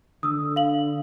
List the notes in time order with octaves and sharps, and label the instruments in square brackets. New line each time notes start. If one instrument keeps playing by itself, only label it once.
[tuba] D3 [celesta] D#6 E6
[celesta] F5 F#7